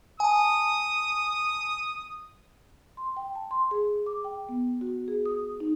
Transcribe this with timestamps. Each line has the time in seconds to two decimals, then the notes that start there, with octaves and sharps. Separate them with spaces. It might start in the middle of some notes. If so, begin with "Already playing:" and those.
0.20 G#5 A5 D#6
2.97 C6
3.17 G5
3.35 A5
3.51 C6
3.71 G#4
4.06 D6
4.24 G5
4.49 B3
4.81 F#4
5.08 G#4
5.26 D#6
5.60 D#4